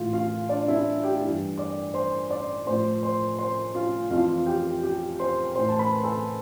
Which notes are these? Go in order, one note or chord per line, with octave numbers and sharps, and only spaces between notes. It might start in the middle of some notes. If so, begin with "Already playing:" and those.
Already playing: A2 E3 F4 F5
F4 F5
D4 D5
E4 E5
G4 G5
G2 E3
D5 D6
C5 C6
D5 D6
A2 F3 C5 C6
C5 C6
C5 C6
F4 F5
F2 E3 F4 F5
G4 G5
G4 G5
C5 C6
A2 E3 C5 C6
A5
B4 B5
A4 A5